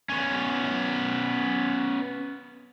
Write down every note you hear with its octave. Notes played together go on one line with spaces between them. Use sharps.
B3 C#4